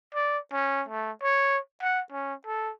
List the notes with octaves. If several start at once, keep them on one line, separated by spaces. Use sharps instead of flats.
D5
C#4
A3
C#5
F#5
C#4
A4